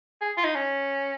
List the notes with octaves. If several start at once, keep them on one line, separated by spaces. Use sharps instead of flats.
G#4
F4
D#4
C#4